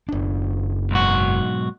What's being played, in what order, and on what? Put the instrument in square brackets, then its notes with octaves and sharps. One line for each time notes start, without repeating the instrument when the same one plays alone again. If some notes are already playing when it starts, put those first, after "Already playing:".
[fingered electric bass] F#1 D4
[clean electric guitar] B1 G#2 F#4